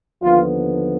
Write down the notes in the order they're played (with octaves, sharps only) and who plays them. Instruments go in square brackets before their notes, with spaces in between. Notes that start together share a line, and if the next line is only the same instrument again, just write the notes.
[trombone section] D#2 D3 F3 B3 F4